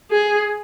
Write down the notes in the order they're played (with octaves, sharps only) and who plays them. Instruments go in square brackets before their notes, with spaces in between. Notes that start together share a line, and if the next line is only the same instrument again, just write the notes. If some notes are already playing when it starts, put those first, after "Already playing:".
[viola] G#4